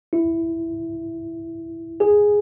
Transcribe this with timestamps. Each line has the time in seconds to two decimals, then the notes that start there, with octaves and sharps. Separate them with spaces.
0.13 E4
2.00 G#4